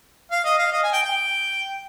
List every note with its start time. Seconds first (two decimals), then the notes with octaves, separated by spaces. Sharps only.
0.31 F5
0.44 D#5
0.59 F5
0.72 D#5
0.83 G#5
0.93 G5
1.03 G5